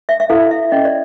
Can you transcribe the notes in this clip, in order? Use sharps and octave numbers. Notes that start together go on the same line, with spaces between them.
E5
E5
E4 A4 F5
E5
C#4 D#5
D5